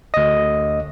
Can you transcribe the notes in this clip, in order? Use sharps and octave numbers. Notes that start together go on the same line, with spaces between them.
D2 D#5